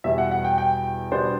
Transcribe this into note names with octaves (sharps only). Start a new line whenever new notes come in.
E2 B2 G3 E5
F#5
F#5
G5
G5
B2 G3 B3 D4 C5